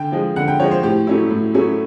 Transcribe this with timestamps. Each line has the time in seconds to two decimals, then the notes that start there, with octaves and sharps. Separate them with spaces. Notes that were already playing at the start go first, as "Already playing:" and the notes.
Already playing: D3 G5
0.12 F3 G#3
0.36 D3 F#5
0.48 G5
0.60 F3 G#3 C#5
0.71 C5
0.83 A2 G4
1.07 F#3 A3 C#4 E4
1.31 A2
1.54 F#3 A3 C#4 E4